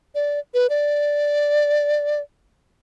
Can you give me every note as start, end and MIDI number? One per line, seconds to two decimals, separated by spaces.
0.15 0.39 74
0.54 0.67 71
0.70 2.20 74